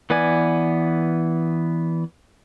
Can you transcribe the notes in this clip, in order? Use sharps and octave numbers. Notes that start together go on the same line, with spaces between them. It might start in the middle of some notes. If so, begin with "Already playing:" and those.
E3 B3 B4 D5 G#5